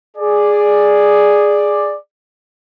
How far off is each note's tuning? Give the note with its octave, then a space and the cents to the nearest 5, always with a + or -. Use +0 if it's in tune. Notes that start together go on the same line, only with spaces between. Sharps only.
G#4 +0 D5 +5